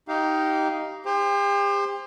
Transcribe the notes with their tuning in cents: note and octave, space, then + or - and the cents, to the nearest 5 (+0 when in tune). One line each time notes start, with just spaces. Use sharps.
D#4 +10 G4 -20 F5 -10
G4 +40 C5 +0